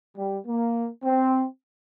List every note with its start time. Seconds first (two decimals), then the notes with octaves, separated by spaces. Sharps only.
0.18 G3
0.47 A#3
1.04 C4